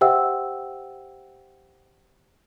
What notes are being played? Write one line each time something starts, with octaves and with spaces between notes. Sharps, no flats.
G4 C5 E5 F#5 G5 E6